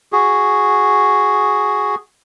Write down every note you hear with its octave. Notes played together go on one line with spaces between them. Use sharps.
F#4 G#4